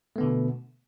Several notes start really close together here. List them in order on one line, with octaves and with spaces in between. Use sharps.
A3 B3 D3 B2